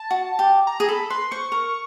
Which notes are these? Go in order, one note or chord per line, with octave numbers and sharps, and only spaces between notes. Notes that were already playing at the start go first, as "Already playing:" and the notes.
Already playing: A5
F#4
G4
A#5
G#4
A4 B5
B4 C6
C5 C#6
A#4